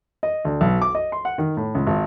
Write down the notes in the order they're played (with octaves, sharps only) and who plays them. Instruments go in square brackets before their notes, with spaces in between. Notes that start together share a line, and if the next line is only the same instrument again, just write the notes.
[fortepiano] D#5
D2
B1
D6
D#5
C6
F#5
D#3
A2
C#2
G#1